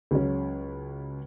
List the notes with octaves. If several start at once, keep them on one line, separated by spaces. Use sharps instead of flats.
C#2 C#3 F#3 C#4